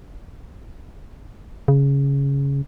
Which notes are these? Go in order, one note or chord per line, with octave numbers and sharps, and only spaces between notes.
C#3